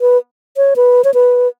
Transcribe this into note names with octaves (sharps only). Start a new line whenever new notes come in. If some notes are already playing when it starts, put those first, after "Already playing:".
B4
C#5
B4
C#5
B4